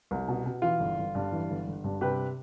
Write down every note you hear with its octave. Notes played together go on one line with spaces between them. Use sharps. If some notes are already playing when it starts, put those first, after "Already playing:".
C2
B2
B2
E3 F4
G1
G1
G2
E3
G1
G1
G2
C3 G4 B4